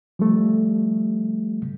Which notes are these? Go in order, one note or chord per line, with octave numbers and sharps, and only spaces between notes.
F3 G3 A3